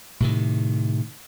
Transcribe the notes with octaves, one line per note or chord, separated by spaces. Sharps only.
A2 C3 D#3